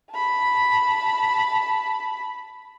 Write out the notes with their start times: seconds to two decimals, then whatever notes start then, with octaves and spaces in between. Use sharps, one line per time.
0.12 A5 B5